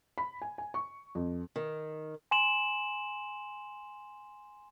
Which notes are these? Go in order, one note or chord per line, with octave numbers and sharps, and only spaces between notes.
B5
G#5
G#5
C#6
F2
D#3
G#5 C6 E7 F#7